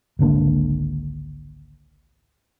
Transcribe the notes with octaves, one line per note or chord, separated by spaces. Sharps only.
G#1 C#2 D3 A#3